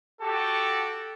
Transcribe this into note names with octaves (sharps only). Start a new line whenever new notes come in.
F#4 G4 A4 A5 D6